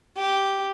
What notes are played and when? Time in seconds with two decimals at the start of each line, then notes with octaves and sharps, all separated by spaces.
0.17 G4